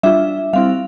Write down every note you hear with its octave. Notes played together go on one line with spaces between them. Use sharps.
G3 D4 F4 E5
G3 C4 E4 F5